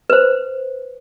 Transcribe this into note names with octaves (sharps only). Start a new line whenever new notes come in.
B4 C5